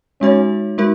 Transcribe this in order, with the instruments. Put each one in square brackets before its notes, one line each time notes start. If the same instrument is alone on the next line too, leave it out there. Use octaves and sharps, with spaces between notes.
[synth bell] G#3 D#4 F#4 C#5 [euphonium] C#4
[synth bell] G#3 D#4 F#4 A#4